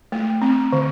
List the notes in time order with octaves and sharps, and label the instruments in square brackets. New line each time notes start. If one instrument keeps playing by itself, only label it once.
[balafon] A3
C4
D3